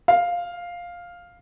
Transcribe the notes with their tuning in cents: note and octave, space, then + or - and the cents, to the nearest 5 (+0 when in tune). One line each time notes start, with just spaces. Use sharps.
F5 +5